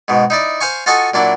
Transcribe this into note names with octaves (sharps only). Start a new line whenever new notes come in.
G#2 B2
D#4 E4 D5
C5 F5 G#5 C#6
F4 F#4 A4 D#5 G#5 C#6
A#2 F#3 D4 E4